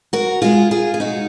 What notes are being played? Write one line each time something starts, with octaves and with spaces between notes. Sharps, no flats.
F#4 A#4
B2 G#3 F4 G#4
F4 G#4
G#4
B2 G#3 D#4 F#4